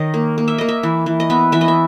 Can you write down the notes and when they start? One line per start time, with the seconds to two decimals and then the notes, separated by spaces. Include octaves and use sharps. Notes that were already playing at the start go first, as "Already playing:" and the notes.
Already playing: D#3 C#5 D#5
0.14 A#3
0.38 A#3
0.48 E5
0.58 A#3 D#5
0.68 E5
0.83 E3
1.06 E3
1.20 D#5
1.30 B3 E5
1.52 E3 E5
1.61 D#5
1.68 E5